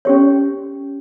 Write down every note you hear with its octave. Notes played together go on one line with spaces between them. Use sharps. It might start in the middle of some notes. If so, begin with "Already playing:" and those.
C#4 G4 C#5